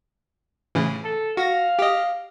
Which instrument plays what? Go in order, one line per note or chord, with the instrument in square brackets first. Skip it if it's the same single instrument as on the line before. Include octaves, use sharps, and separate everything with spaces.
[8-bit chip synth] A2 C#3 E3
[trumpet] A4
[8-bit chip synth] F#4 A#6 [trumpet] F5
[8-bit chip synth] G4 D#5